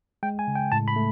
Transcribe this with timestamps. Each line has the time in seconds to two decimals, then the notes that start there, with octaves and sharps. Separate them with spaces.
0.23 G#3 G5
0.39 G#5
0.47 C#3
0.55 G5
0.72 A2 A5
0.88 B5
0.96 A3